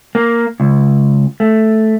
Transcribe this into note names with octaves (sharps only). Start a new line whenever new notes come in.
A#3
C#2
A3